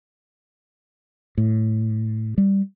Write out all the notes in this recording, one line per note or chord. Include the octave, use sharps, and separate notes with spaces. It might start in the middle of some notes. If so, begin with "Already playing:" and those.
A2
G3